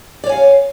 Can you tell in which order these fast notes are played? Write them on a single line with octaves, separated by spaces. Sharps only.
D5 C#5 G#5 F5